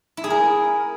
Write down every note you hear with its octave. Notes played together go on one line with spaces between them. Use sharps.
E4
G#4
A#4